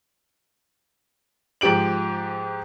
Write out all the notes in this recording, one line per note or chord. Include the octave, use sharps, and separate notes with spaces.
G#2 F3 G4 D7 F#7